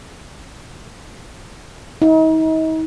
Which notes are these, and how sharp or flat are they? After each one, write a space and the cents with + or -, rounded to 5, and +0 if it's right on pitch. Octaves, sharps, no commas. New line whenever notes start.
D#4 +40